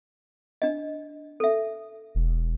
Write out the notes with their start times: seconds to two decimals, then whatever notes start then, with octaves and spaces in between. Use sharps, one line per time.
0.62 D4 D#5
1.40 A4 E5
2.15 E1